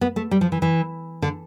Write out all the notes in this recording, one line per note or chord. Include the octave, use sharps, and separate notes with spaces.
B3
A3
G3
F3
E3
E3
D3